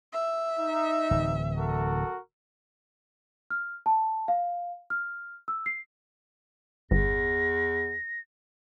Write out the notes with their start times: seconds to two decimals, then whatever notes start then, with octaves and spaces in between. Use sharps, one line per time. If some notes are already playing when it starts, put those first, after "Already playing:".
0.13 E5
0.59 D#4
1.11 D1 E3
1.56 F#4 A4 A#4
3.50 F6
3.86 A5
4.28 F5
4.90 F6
5.48 E6
5.66 C7
6.91 G1 E2 A#6